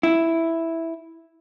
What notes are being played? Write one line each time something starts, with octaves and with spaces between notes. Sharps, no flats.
E4